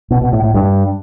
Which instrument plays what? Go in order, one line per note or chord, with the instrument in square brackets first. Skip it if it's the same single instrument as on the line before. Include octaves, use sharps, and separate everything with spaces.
[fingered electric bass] B2
B2
A2
A2
G2